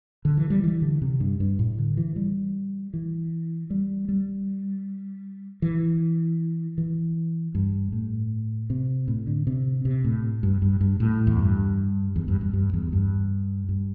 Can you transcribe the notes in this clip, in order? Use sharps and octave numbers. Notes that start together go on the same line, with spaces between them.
D3
E3
G3
E3
D3
C3
G2
G2
A2
D3
E3
G3
E3
G3
G3
E3
E3
G2
A2
C3
A2
D3
C3
C3
A2
G2
G2
G2
A2
E2
G2
E2
G2
G2
G2
E2
G2
G2